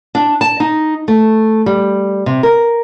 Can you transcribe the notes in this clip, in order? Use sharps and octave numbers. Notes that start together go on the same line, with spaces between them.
D4
A5
D#4
A3
G3
C3
A#4